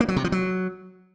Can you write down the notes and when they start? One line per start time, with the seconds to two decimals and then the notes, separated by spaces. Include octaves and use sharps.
0.01 A#3
0.08 F#3
0.16 C3
0.24 F3
0.32 F#3